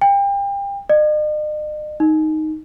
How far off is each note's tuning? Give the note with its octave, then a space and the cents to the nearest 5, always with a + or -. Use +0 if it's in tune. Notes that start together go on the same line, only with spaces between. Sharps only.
G5 +30
D#5 -45
D#4 +0